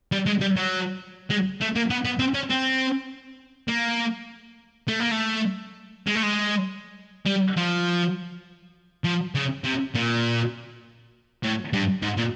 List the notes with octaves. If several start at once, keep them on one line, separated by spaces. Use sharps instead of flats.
G3
G#3
G3
F#3
G#3
A3
A#3
B3
B3
C4
C#4
C4
A#3
A3
A#3
A3
G#3
A3
G#3
G3
F3
F3
C#3
C3
A#2
A2
G2
G#2
A#2